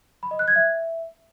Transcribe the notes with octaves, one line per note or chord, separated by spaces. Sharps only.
B5
D#5
F#6
G#6
E5